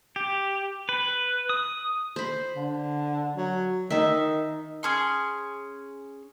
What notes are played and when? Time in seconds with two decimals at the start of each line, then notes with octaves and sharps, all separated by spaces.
0.16 G4
0.89 B4
1.49 D#6
2.16 C5 B5
2.56 D3
3.37 F#3
3.90 D#3 D#4 E5
4.83 C#4 G#4 C6